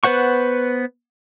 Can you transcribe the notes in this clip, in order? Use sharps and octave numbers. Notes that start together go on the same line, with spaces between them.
B3 B4 C5 F#5 C#6